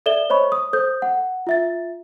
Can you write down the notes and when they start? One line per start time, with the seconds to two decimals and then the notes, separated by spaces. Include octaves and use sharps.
0.06 A4 D5 E5 E7 G7
0.30 C5 C#5 D#5 B5 C#6
0.52 D#6
0.73 A4 C5 D#6 G6
1.02 F#5
1.47 F4 E5 A6